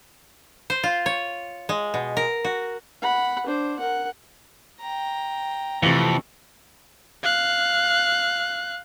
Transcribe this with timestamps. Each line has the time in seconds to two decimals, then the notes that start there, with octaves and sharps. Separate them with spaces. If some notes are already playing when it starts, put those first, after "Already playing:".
0.70 C5
0.83 F4
1.06 C#5
1.69 G#3
1.94 B2
2.17 A#4
2.44 F#4
3.02 F#5 B5
3.47 D4 C5
3.79 A#4 F#5
4.81 G5 A#5
5.83 F2 C3 E3 A3
7.23 F5 F#6